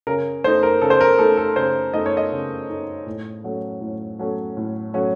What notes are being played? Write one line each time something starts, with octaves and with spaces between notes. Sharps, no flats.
C#3 A#4
A3 D#4 C5
A#4
C#3 A4
C5
A#4
A3 D#4 A4
A4
C#3 C5
A3 D#4 D#5
C#5
D#5
C#3
A3 D#4
A2
F#3 A3 C#4
A2
F#3 A3 C#4
A2
F#3 A3 C#4